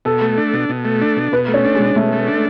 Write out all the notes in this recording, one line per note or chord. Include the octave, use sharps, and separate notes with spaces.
B2 A4
A3
D4
B2
B2
A3
D4
B2
B2 B4
A3
C#4
D4
G#3
B2
B2 A3
A3
D4